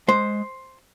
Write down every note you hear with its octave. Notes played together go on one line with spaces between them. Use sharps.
G#3 C5